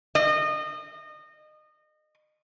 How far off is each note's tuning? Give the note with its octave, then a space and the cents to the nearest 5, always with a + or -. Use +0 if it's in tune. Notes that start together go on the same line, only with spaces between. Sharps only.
D#5 -25